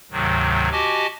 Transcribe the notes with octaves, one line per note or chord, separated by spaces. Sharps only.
D2 G#2 C3 D#3 F#3
F#4 G4 D#5 G#5 A5 D6